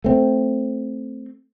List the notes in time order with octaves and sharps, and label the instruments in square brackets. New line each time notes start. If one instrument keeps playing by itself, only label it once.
[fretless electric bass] A3 C4